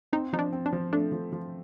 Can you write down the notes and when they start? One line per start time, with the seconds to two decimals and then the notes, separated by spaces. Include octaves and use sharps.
0.13 C4 D#4
0.33 F3 D#4
0.39 D4
0.52 C4
0.66 D4
0.72 F3
0.92 A3 D4
1.12 F3
1.32 F3